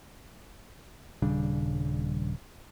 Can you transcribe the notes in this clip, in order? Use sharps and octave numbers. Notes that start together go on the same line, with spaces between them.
D#1 C#3 G3 D4